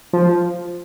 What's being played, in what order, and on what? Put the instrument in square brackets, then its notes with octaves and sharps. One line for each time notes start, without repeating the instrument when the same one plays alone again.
[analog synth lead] F3